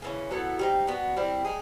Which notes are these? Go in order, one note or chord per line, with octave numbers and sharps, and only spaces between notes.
C#3 E3 A3 C#4
F#3 B3 E4 A4
G3 C4 D#4
B3 D4 F#4
G3 C4 E4
G#3 D#4 G#4